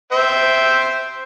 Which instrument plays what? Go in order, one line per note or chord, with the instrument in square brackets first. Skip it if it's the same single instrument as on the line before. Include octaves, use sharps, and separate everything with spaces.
[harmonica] C5 E5 G5